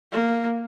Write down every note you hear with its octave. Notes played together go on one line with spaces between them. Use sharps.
A#3